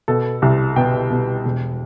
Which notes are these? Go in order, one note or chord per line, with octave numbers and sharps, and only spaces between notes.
B2 A4
C2
B2 G5
B2
E1